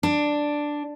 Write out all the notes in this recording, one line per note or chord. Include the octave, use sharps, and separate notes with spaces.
D4